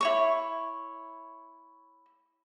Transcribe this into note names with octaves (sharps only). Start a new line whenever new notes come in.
E4 C#5 C#6